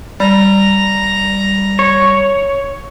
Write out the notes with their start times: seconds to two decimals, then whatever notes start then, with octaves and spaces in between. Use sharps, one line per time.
0.20 G3 A#5
1.79 C#5